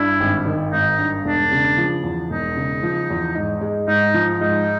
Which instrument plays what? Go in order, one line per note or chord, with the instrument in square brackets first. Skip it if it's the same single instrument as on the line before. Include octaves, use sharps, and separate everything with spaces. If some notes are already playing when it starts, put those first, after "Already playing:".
Already playing: [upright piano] G2 [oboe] E4
[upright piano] G#1
D#3
[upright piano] G#1 [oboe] D#4
[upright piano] G2
[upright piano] E1 [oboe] D4
[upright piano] C#3
F3
E2
[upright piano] E1 [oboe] D#4
[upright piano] C#3
F3
E2
G#2
G#3
[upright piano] G#2 [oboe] D#4
[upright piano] F3
[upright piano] G#2 [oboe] D#4